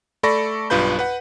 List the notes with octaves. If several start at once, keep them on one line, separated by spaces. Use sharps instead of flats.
A3 A4 D5 B5 C#6 A#6
B1 G2 F4 B4 B5 G6
B4 F#5